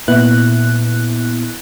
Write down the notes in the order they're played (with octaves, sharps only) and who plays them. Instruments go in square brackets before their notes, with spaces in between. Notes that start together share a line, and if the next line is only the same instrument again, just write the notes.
[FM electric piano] A#2 B3 E4 F#6